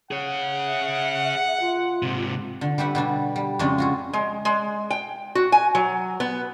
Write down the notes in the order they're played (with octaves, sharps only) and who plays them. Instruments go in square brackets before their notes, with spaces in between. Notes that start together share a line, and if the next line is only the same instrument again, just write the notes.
[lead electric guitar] G#4 C#5 [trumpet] F#5
[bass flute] E5
F4
[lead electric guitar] G#2 C3
[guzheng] D3
G3 G4 B4 E5 F#5
B2 G3 D4
G3
F2 C#3 G#3 C#4 D4
F4 F#4 G#4
[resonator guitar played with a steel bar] G#3
G#3
G5
F#4
G#5
F#3
B3